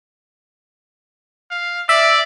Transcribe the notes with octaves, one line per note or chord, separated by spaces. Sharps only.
F5
D5 E5